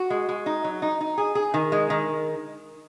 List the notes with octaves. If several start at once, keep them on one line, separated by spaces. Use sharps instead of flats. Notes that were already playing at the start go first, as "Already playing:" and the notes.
Already playing: F#4
G#3
G#3
D#4
F#3
D#4
D#4
G#4
G#4
D#3
G#3
D#3